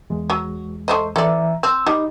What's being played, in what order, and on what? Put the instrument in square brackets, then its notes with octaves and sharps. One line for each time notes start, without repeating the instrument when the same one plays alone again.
[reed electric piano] E2 G#3
[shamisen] F#3
A3 C5 D#5
[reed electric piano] E3 E5 A#5 [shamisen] A4 D5
[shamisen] C4 [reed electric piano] E6
[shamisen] G3 [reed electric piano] D#4